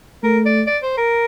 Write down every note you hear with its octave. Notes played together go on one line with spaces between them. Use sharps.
A3 A#4
D5
D5
C5
A#4